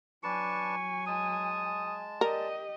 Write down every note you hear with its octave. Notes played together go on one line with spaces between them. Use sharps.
F#3 D4 B4 G#5 A5 C#6
G#3 A5 D#6
G4 A#4 D5 D#5